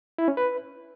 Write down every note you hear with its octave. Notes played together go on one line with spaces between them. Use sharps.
E4
C#4
B4